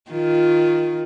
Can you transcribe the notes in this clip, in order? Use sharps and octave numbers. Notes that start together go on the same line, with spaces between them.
D#3 F4